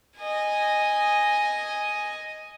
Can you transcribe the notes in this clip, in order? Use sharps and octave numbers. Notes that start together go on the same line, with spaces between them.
D#5 G#5